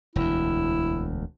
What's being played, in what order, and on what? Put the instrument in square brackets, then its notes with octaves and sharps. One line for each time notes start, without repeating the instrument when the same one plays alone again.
[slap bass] E1 D2 [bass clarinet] E4